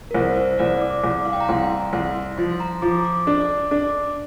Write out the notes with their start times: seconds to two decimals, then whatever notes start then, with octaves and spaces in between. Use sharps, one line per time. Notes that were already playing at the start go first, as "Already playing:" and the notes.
0.11 A#4
0.15 C2 C5
0.37 C5
0.59 C2 D5
0.81 D6
1.04 C2 D6
1.25 F5
1.33 G5
1.40 A#5
1.48 C2 C6
1.93 C2 C6
2.38 F3 C6
2.60 A#5
2.82 F3 D6
3.05 D6
3.27 D4 D6
3.71 D4 D6